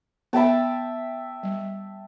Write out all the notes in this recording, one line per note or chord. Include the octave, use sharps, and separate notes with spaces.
B3 E5 G5 A5 B5
G3